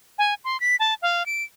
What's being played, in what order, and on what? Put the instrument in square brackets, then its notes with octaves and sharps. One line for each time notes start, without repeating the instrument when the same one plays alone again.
[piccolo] G#5
C6
B6
A5
F5
D7